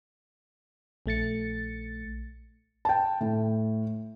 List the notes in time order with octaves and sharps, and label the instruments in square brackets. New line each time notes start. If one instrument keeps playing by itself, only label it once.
[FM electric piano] A#1 A3 A6 C#7
[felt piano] G5 A5
A2